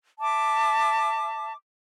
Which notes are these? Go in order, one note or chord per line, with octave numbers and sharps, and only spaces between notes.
E5 A5 D6